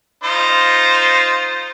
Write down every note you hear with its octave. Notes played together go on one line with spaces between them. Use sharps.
D#4 F4 C5